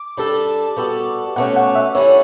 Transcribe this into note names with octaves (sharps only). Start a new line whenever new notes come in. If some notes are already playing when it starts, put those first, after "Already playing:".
Already playing: D6
G3 D4 A4
G3 B3 F#4 A4
B2 A3 C#4 F#5
F#5
E5
D3 G3 C#4 E4 C#5